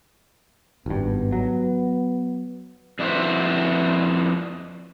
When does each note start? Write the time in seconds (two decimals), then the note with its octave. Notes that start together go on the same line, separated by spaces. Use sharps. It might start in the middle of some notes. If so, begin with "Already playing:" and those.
0.86 G#1 G2 B3
1.32 F#3
2.99 F2 D4 E4 F#4 B4 C5